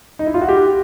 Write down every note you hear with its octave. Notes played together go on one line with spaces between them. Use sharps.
D#4
E4
F4
F#4
G4